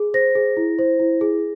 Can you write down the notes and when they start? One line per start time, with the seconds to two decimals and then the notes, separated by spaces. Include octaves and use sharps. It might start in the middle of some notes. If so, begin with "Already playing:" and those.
Already playing: G#4
0.14 C5 A#6
0.35 G#4
0.57 E4
0.79 C5
1.00 E4
1.21 G#4